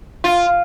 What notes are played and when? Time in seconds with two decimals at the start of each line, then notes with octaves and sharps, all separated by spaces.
0.24 F4